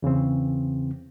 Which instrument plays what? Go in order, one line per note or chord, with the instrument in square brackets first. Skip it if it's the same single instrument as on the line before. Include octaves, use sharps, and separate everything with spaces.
[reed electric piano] E2 C#3 E3 C4